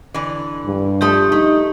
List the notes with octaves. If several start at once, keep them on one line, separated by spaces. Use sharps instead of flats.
D3 E3
G2
F3 A3 G4 A4 D#6
A3 D#4